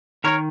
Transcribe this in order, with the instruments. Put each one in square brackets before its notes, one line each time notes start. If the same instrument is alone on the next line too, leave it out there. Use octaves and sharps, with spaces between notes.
[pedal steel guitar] D#3 A#4 C#5